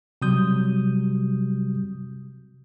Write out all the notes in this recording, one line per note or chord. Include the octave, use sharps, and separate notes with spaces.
C3 F#3 G3 D#6 G6